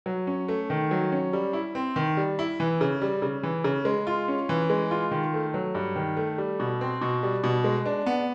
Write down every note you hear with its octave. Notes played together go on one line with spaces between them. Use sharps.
F#3
C#4
A3
D#3
F#3
C#4
G3
E4
C4
D#3
G3
E4
E3
C#3
G3
C#3
E3
C#3
G#3
F4
C#4
E3
G#3
F4
D#3
A3
F#3
G2
D#3
A3
G3
B2
C4
B2
G3
B2
G#3
D4
B3